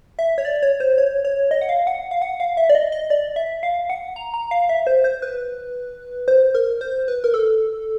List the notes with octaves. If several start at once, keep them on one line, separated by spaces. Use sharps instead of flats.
E5
C#5
D5
C#5
C5
C#5
C#5
D#5
F#5
F5
F#5
F5
F#5
F5
E5
D5
D#5
D#5
D5
E5
F5
F#5
A#5
A#5
F5
E5
C5
C5
B4
C5
A#4
C5
B4
A#4
A4